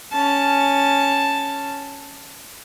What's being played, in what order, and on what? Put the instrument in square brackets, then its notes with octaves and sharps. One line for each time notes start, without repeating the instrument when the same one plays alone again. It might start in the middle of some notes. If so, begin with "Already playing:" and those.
[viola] C#4 A5